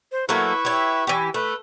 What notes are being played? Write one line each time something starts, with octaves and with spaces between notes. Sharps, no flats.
C5
F#3 A3 A#3 E4 B4 E5 C#6
G4 C#5
E3 G4
A3 B4